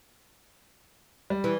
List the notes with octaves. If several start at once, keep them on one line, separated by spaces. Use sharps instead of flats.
G3
E3